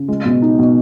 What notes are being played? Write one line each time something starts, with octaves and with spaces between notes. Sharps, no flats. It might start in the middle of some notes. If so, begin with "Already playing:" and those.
Already playing: C#3
G#3
B2
D#4
B2